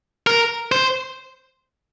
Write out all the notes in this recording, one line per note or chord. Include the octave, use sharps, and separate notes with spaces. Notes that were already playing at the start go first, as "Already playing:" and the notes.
A#4
C5